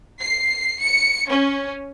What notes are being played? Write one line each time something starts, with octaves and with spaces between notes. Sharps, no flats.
C7
C#7
C#4